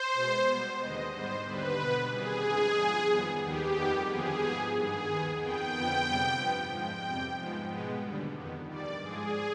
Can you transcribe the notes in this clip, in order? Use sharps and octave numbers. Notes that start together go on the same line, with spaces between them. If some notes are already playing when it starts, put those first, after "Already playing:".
Already playing: C5
B2 G#3 B3
B2 G3 B3
D#2 D3 G#3 B3 D#5
G#2 G3 B3 C5
D#2 D3 G3 B4
B2 B3
C3 D#3 G3 G#4
F2 D3 F3 G#3
G#2 F3 B3
F2 D#3 G3 B3
D#2 D#3 B3 G4
F2 D#3 G3 B3
D#2 D3 F3 B3 G#4
G#2 F3 B3
G2 D#3 B3 G#4
D#2 D#3 B3
F2 D#3 B3 G5
F2 D3 F3 B3
F2 C3 G3 B3
G2 F3 B3
G#2 F3 G#3 G5
F2 C3 G3
G#2 F3 G#3 B3
B2 G#3 B3
D#2 D3 G3
F2 D#3 B3
G2 D#3 G3 D5
G#2 F3 G#3 G#4